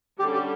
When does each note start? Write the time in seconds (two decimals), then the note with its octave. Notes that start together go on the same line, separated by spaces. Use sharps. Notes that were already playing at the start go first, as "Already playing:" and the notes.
0.19 D3 G3 C#4 G4
0.34 G4